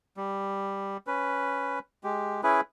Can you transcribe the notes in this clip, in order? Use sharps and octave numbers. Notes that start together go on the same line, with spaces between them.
G3
C#4 B4
G#3 G4
C#4 E4 G#4 B4